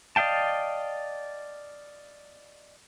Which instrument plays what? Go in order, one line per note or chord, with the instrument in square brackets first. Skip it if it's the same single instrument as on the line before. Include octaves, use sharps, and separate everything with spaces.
[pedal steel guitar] D5 D#5 F5 G5 A5